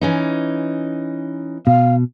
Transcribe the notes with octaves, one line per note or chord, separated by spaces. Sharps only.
E3 C#4 D#4
B2 F5